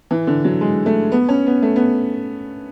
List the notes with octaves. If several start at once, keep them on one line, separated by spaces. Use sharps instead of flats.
E3
D3
F#3
G#3
A3
B3
C#4
B3
A3
B3